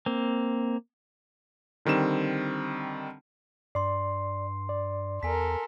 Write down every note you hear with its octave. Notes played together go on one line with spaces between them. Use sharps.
A#3 C4
D3 D#3 G3 C4 E7
G2 D5 C6 C7
D5
E2 A4 A#4 G#5 B6